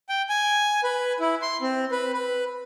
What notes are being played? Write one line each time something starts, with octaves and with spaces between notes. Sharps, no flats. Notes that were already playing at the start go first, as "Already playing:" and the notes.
G5
G#5
B4
E4
C6
C4
B4
B4